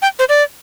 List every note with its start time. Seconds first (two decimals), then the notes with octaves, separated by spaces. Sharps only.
0.02 G5
0.19 C5
0.29 D5